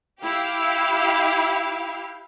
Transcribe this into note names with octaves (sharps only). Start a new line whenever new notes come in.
E4 G4 F5